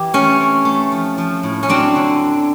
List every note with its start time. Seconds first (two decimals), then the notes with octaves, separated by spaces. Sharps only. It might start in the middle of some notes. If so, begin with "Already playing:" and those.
Already playing: E3 G4
0.14 A3 C#4
0.40 C4
0.65 A3
0.92 F3
1.18 F3
1.43 A2
1.63 C#4
1.69 F#3 C4 D4
1.96 D3